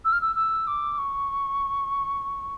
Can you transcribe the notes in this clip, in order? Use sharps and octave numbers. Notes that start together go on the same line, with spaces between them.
E6
F6
E6
E6
D6
C#6